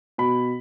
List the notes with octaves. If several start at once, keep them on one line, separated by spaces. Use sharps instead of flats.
B2 B5